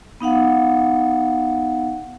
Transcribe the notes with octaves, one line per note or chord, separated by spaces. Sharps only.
B3 D#4 F5 F#5